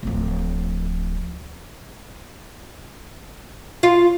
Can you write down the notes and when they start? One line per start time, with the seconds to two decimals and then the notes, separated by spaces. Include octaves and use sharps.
0.03 D1 F3
3.83 F4